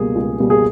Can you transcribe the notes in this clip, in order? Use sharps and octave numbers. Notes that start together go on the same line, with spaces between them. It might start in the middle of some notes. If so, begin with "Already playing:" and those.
Already playing: C#2 B2 G3 A#3 G#4
C#2
B2 G3 A#3
G#4